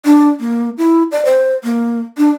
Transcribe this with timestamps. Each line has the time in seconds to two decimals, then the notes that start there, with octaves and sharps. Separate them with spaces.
0.05 D4
0.40 A#3
0.78 E4
1.12 D5
1.25 C5
1.64 A#3
2.18 D4